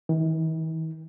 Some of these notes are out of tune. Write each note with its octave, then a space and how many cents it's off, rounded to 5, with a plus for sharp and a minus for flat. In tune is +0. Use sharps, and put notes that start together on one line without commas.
E3 -45